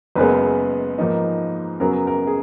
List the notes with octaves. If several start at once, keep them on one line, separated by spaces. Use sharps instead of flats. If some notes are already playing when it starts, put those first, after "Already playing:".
F#1 F#2 C#3 G#3 B3 B4
G#2 F3 A#3 D#4
F#2 C#3 F#3 B3 A#4
A#4
G#4